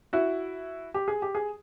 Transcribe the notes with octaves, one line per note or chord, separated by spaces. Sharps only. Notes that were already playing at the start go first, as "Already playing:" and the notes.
E4 F#4
G4
G#4
G4
G#4